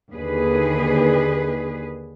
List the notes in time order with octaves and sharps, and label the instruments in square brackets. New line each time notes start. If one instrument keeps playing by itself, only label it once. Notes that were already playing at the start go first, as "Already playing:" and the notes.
[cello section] D#2 D3 G#4 B4